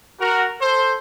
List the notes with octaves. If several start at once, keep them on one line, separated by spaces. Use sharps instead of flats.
F#4 A#4
A4 C5